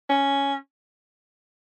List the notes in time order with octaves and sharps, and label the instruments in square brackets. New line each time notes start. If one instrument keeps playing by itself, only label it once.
[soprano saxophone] C#4